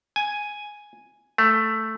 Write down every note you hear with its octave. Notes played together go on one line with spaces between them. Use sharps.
G#5
A3